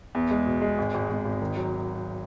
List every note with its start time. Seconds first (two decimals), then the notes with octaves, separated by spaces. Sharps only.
0.15 E2
0.31 G#3
0.47 B2
0.62 G#3
0.78 G#1
0.94 G#1
1.09 G#1
1.25 G#1
1.41 D#3
1.57 F#3